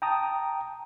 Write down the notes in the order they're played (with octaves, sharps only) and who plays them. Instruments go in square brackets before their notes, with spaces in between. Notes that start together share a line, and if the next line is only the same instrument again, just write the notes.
[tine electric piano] G5 A5 A#5 D#6